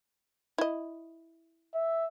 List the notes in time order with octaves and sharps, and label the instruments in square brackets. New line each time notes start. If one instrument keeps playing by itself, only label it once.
[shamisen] E4 D#5
[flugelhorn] E5